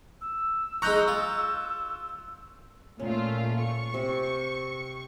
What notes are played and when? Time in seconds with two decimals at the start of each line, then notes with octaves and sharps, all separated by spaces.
0.21 E6
0.82 G#3 D#4 A#5 C#6 F#6 G6
1.08 F4
3.00 A#2 A3 C#4 F4
3.61 C#6
3.94 C3